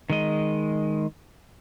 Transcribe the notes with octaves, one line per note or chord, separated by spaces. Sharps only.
D#3 G#3 D#5